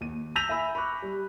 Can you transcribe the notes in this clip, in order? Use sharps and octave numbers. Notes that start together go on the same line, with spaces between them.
D#2 D#7
E6 G6 A#6 B6 D#7 F7
E5 G#5 B5 E6
B5 C#6 D6 F#6
G3